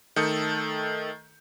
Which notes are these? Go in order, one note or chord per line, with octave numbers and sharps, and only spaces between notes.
D#3 A3 A4 D#6 G6 C#7